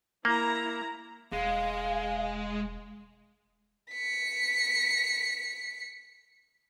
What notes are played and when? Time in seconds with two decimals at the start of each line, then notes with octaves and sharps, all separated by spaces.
0.25 A#3 E4 A#5
1.32 E1 G#3 F5
3.92 B6 C#7